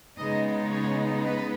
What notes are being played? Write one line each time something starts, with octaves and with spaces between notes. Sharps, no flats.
C#3 G#3 B3 D#4 D#5
C#5
B4